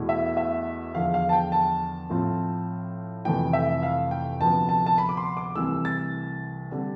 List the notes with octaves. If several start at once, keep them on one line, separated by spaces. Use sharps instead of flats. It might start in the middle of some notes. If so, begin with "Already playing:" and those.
Already playing: E2 B2 A3 E4
E5
E5
E2 D3 F3 F5
F5
A5
G5
A5
A2 F3 C4 F4
F1 F2 C3 E3 A3 G5
E5
F5
G5
D2 C3 F3 B3 A5
A5
A5
B5
D6
C6
D6
C2 C3 E3 A3 E6
A6
D3 G3 C4